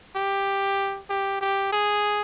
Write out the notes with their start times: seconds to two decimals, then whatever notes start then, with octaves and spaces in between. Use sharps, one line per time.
0.16 G4
1.09 G4
1.41 G4
1.73 G#4